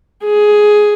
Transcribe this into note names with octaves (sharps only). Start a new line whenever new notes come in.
G#4